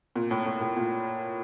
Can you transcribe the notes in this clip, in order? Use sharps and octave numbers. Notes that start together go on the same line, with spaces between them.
A#2
A2
A2
A2
A#2